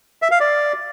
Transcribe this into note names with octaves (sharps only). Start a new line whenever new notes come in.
E5
F5
D5